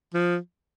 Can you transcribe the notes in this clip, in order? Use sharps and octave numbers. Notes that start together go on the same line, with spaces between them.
F3